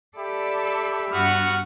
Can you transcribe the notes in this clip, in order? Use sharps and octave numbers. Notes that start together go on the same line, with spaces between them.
G4 A4 D5 E5 B5
G2 B3 F#4 F#5 F6